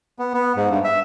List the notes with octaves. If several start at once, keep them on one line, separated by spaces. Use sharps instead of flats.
B3
B3
G#2
G2
E5